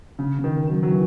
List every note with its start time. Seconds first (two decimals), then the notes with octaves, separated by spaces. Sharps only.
0.19 C#3
0.38 C#3
0.44 D#3
0.68 D#3 F#3
0.83 F#3
0.92 E3